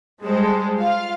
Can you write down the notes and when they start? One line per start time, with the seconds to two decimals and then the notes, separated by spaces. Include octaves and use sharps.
0.22 G3 G#3 G#4 A4 C5
0.79 F4 F5